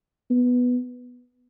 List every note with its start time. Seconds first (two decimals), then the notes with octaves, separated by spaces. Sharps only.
0.30 B3